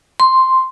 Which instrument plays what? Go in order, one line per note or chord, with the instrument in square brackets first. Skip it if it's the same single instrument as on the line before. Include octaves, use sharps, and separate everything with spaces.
[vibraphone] C6